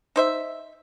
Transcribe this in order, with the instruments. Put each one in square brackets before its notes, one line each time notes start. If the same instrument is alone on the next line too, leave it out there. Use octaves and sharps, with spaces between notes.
[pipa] D#4 C5 E5